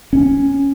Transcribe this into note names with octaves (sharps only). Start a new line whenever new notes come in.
C#4